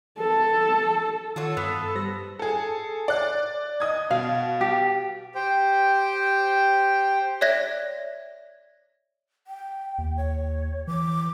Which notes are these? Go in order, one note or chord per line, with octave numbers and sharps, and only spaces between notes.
A4
D#3 F4 F#4 A4 C#5
G2 B3 F#6
G3 C5 A#6
G#4 A4
D5 F#6
D#5 D#6 G#6
B2 F5
G4
G4 C5 G5
C#5 D5 E5 F#6 G#6 A#6
G5
D#2
C#5
E3 D6